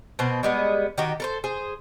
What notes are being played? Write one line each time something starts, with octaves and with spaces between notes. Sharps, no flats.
B2 C4
G3 G#3 B3
D#3 F#4 G4
A4 A#4 C5
G#4 C5